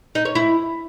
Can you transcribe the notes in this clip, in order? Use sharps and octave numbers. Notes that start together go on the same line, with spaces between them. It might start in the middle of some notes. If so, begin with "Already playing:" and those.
D#4
C#5
E4